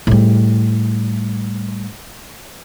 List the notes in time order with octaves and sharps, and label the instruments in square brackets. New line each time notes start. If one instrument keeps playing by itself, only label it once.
[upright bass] A2 G3